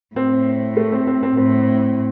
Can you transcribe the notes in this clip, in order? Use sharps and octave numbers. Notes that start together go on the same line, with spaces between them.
A2 C4
A3
C4
C4
C4
A2 C4